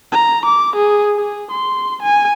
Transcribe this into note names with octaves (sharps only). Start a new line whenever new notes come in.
A#5
D6
G#4
G#4
C6
G#5